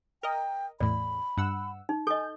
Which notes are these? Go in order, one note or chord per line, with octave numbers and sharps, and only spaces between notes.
A#4 D#5 G5
E2 A2 D5 B5
G2 F#5 E6
D#4
A4 D#5 G#5 G6